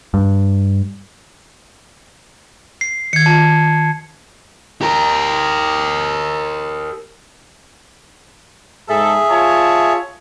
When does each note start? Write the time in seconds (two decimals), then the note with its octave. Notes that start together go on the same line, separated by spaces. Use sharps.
0.14 G2
2.81 C7
3.13 D#3 G#6 C#7
3.26 F4 A5
4.81 G4 A#4
8.89 G#2 G#4 A4 E5
9.31 F4 C#5 A5